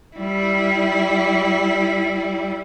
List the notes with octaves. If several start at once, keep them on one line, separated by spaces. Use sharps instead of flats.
G3 E4